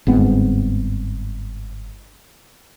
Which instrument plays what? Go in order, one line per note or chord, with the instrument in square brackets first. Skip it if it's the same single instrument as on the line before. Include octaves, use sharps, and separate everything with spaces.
[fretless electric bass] G1 G#2 B3 C4